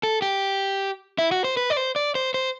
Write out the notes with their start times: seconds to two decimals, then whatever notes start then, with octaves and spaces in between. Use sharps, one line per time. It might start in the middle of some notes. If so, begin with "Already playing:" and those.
0.03 A4
0.22 G4
1.18 E4
1.32 F#4
1.44 C5
1.57 B4
1.70 D5
1.77 C5
1.96 D5
2.15 C5
2.34 C5